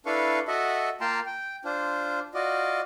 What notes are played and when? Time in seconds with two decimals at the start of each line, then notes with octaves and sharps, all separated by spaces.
0.06 D4 E4 A4 B4 F5 C#6
0.48 F#4 A4 D#5 E5 F#5
1.01 A#3 F4 G5 A5 A#5 C6
1.26 G5
1.65 D4 F4 C5
2.34 F4 F#4 D5 D#5